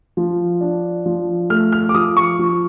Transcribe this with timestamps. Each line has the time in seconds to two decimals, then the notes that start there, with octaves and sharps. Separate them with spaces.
0.17 F3
0.61 D4
1.06 F3
1.50 A3 F6
1.73 F6
1.89 D6
1.94 F3 D#6
2.17 C#6
2.39 F3